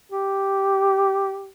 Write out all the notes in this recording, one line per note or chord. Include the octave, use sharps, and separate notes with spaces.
G4